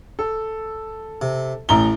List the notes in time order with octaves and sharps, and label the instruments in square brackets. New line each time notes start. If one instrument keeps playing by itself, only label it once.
[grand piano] A4
[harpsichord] C3
[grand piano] A1 A#5 G7 [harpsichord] A2